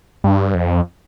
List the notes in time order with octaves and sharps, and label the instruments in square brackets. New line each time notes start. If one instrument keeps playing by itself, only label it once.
[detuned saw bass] G2
F2